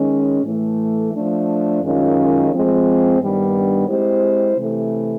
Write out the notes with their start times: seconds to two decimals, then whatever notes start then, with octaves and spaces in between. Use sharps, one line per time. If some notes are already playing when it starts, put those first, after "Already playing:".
Already playing: D#3 G#3 C#4
0.43 A2 E3 A3
1.12 F3 A3 D4
1.82 F#2 D#3 G#3 C#4 F4
2.50 F3 G#3 C4
3.19 G2 D#3 G3 B3 D4
3.88 G#3 C4 E4 G4 C5
4.58 C3 E3 A3